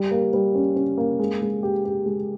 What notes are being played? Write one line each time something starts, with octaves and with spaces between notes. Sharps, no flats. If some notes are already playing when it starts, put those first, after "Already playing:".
Already playing: G3
A#3
G3
C#4
C#4
A#3
G#3
G#3
G4
G4
G#3